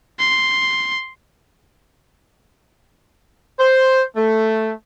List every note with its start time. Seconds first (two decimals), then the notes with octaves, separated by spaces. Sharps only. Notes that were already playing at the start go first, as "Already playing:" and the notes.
0.19 C6
3.59 C5
4.16 A3